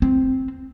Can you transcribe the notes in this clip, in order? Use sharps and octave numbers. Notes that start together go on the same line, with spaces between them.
C4